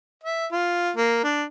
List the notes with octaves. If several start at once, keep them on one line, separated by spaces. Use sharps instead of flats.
E5
F4
A#3
D4